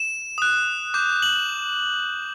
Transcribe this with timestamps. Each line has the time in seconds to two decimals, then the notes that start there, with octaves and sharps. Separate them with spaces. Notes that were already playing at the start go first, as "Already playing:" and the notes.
Already playing: E7
0.38 D#6 F#6
0.94 D6 G6
1.22 F#7